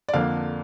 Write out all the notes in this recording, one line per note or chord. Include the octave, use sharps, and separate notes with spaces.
D5
F2 D3 A#3 D4 F5